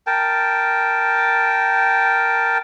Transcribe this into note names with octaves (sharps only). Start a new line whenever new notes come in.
A#4 G5 A5